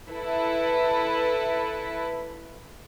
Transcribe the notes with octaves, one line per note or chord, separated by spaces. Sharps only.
E4 A4 B4